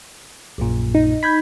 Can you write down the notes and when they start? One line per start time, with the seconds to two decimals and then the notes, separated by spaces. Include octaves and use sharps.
0.58 A#1 F#2 A#2
0.95 D#4
1.23 B5 G6 G#6 B6